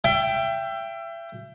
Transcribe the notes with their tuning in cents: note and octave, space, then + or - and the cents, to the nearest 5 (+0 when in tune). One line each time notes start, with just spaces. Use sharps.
E5 +30 G5 +0